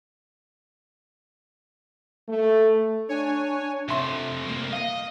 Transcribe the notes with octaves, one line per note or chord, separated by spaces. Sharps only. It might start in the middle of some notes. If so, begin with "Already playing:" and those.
A3
D4 C#5 G#5
C3 A3 E5 C6
C2 A#3
D#5 F5